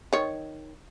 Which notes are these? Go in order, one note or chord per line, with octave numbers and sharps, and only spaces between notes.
D#3 C#5